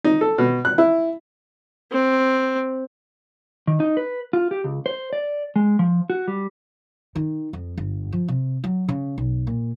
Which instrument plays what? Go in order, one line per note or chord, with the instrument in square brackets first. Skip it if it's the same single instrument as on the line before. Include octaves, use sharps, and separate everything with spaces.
[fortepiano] D#4
A4
B2
F#6
E4
[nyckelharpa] C4
[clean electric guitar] D#3
D#4
B4
F4
G4
C#2
C5
D5
G#3
F3
F#4
G3
[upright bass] D#3
F2
G1
F3
C3
F#3
C#3
B1
A#2